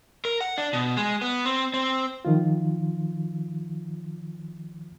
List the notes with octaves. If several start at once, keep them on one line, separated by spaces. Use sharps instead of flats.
A#4
F#5
D4
B2
G#3
B3
C4
C4
D#3 F3 F4